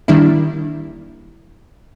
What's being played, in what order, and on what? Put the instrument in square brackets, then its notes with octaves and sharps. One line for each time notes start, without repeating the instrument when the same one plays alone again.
[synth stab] D#3 G3 A#3 D4 E4